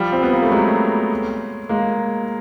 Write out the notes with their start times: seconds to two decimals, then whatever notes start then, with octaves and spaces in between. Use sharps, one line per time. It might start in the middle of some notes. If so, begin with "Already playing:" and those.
Already playing: F3 G3
0.12 C4
0.23 B3
0.33 A#3
0.43 A3
0.52 F#3 G#3
1.69 G#3 A#3